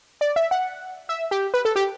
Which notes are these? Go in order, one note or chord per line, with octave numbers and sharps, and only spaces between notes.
D5
E5
F#5
E5
G4
B4
A4
G4